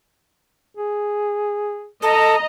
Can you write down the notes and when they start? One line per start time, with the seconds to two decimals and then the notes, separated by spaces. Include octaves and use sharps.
0.77 G#4
2.02 A4 D#5 A#5